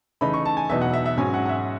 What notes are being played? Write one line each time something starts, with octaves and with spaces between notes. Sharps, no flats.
C#3 E3 A3 D#4 B5
C#6
A5
G#5
E2 B2 F#3 B3 D#4 E5
F#5
E5
E5
G#2 F#3 C#4 G#5
F#5
F#5
E5